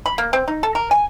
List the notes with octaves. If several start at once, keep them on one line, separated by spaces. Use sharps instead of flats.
B5
A#3
C4
D#4
A4
A#4
G#5